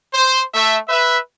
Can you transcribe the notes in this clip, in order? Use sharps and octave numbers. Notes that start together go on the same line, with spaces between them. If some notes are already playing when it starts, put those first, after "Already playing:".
C5
A3 E5
B4 E5